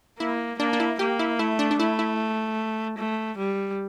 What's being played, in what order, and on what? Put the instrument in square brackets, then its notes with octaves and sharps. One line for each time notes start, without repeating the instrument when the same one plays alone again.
[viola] A#3 [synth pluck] E4
[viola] A#3 [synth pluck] D4
[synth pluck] D4
E4
[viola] A#3 [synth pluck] G4
[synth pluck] E4
[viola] A3 [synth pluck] E4
[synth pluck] D4
D4
[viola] A3 [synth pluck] E4
[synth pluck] E4
[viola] A3
G3